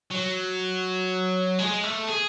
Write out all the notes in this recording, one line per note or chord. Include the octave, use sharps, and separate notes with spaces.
F#3
G#3
A3
G#4